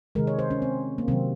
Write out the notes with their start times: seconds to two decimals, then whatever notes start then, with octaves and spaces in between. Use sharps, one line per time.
0.15 C3 D#3 G#3 A#4
0.27 C#5
0.39 C5
0.50 C#4
0.62 C4
0.98 A#3
1.08 C3 D#3 F#3 C4